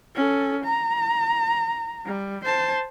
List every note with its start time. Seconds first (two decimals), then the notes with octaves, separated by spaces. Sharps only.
0.15 C#4 A4
0.64 A#5
2.06 G3
2.44 C5 A5